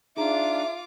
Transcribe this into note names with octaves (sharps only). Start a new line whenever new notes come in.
D4 D#4 F4 G#4 E5 A#5 D6